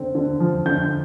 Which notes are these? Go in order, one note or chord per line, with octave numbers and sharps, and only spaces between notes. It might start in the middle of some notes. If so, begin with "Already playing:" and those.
Already playing: D3 C4
D3
F3
D3 G6